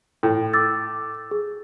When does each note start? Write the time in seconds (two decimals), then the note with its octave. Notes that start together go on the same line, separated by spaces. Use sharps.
0.23 A2 G5
0.54 D6 E6 A6
1.31 G#4